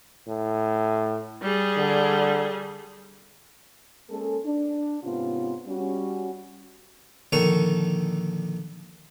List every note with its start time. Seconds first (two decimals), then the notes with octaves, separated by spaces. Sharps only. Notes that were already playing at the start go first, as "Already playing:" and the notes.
0.28 A2
1.42 G3 G#4
1.77 D3
4.10 G#3 A#3 C#4 G#4 A4
4.45 D4
5.03 G#2 C3 B3 C#4 F4
5.67 G3 C#4 F#4
7.32 A#1 D3 D#3 D#4 A4 C#6